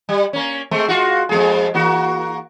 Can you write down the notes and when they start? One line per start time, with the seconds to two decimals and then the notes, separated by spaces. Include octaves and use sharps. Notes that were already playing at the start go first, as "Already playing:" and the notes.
0.09 G3
0.33 A#3 C#4
0.71 G#3 A3 C4
0.88 G#3 F4 F#4
1.29 F2 G#3 G#4
1.74 E3 A#3 F#4